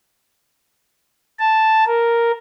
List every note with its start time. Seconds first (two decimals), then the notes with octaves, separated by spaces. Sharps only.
1.39 A5
1.86 A#4